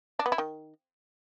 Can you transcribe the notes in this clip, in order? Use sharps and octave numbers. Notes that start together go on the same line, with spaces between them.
D4
B3
E4
D#3